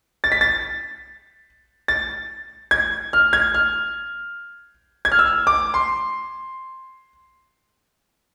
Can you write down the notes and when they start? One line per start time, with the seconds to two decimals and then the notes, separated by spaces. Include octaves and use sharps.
0.24 A6
0.32 B6
0.41 A6
1.88 A6
2.71 G#6
3.13 F6
3.33 G#6
3.54 F6
5.05 G#6
5.12 F6
5.19 E6
5.47 D6
5.74 C6